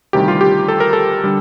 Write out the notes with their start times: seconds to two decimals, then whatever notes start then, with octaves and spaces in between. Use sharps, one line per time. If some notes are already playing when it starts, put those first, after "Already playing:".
0.13 D2 C3 D#3 G3 G4
0.28 F4
0.41 G4
0.68 A4
0.80 A#4
0.93 A4
1.24 D3 G3